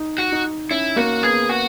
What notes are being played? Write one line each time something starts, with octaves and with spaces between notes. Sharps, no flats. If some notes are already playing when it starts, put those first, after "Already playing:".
Already playing: D#4
F#4
D#4
C#4 E4
A#3 F#4
B3 G#4
F#4